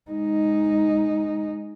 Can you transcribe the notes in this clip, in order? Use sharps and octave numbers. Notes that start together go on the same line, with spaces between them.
G#3 D#4